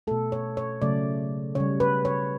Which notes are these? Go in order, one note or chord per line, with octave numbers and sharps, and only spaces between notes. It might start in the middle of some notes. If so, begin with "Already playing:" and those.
B2 A3 A4
C#5
C#5
C#3 F#3 A3 D5
C#3 G3 C#5
B4
C#5